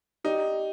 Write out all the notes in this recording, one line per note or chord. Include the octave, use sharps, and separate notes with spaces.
D#4 G4 D5